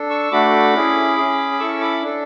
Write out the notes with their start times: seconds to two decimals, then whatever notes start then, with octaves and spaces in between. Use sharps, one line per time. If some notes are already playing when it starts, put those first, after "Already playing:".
Already playing: D4 A4
0.10 C#6 E6
0.31 A3 D4 F#4 A4 B5 D6
0.74 C#4 E4 G#4
1.17 C#4 G#4
1.59 C#4 E4 A4 C#6 E6
1.81 B5 D6
2.02 D4 A4